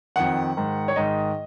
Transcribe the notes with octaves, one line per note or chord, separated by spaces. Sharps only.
F2 D#3 F#5
G#2 D#3
C#5
G#2 D#3 D#5